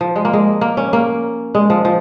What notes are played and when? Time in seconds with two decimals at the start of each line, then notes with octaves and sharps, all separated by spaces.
0.01 F3
0.16 G#3
0.25 A#3
0.33 G#3
0.61 A#3
0.77 C#4
0.93 A#3
1.55 G#3
1.70 F3
1.85 F3